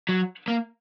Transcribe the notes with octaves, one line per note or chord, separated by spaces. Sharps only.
F#3
A#3